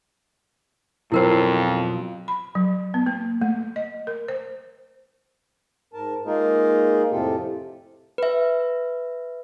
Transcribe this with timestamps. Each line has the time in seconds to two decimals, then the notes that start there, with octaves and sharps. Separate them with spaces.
1.12 F2 B2 F#3 E4 F4 A#4 C5
2.28 B5
2.55 F#3
2.94 B3
3.06 A#3
3.42 A3
3.76 D#5
4.07 A#4
4.28 C5
5.93 G#2 A#4 A5
6.26 G#3 A#3 D#4 F4 G#4 A#4
7.11 F2 A2 C3 F4 G4 A4
8.18 B4 E5